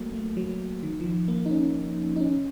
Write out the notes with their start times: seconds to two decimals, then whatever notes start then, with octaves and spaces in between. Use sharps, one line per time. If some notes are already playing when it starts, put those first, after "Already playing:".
Already playing: F#3 A3 A#3
0.14 A3
0.37 F#3
0.83 D#3
1.01 F3
1.05 D#3
1.28 A#3
1.46 D#4
1.51 C#4
2.16 D#4
2.21 C#4